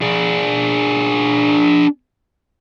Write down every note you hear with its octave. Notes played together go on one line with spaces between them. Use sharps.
D4 G#4